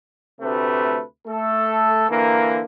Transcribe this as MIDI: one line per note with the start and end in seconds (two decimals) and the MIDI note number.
0.41 1.01 38
0.41 1.01 48
0.41 1.01 57
0.41 1.01 71
1.27 2.09 57
1.27 2.09 69
2.09 2.62 50
2.09 2.62 52
2.09 2.62 58